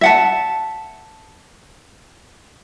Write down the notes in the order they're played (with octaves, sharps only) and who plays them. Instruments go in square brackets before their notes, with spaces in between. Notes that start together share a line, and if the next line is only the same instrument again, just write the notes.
[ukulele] E5 F#5 A5